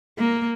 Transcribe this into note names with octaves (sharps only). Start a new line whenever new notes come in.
A#3